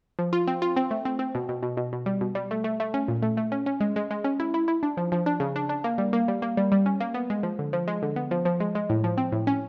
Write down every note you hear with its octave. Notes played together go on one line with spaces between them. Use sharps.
F3
F4
C4
F4
C4
A3
C4
C4
B2
B2
B2
B2
B2
G3
B2
G3
A3
A3
A3
C#4
A#2
A3
A3
C#4
C#4
G#3
G#3
G#3
C#4
E4
E4
E4
D4
F3
F3
D4
C#3
D4
D4
A#3
G3
A#3
G3
A#3
G3
G3
C#4
A#3
B3
G#3
F3
D3
F3
G#3
D3
B3
F3
F3
G#3
G#3
A2
F3
C4
A2
C#4